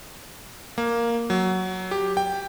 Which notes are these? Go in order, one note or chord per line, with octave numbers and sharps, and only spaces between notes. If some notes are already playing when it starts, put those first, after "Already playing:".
A#3
F#3
G4
G5